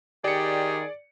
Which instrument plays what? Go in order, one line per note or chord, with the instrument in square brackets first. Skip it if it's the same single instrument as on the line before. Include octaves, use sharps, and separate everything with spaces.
[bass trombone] D#3 [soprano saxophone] G4 [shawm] G#4 [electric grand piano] D5 C#7